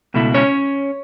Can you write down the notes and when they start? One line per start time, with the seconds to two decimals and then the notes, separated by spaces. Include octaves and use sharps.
0.14 C#2 B2 A3 E4
0.34 C#4 C#5